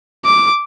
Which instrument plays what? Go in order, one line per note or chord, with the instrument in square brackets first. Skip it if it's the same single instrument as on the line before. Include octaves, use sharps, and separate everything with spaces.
[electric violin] D6